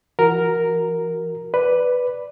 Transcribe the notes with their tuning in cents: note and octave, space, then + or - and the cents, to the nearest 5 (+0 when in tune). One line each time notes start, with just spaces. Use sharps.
E3 +45 F#4 +0 A#4 +0
B4 +5 D5 +0